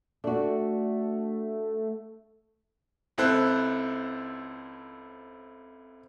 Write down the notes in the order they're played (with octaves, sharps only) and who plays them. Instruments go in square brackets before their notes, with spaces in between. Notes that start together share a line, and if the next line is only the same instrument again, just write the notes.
[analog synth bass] A3 [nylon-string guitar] D4 F#4
[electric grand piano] C#2 C4 E4 A4 C5 F#6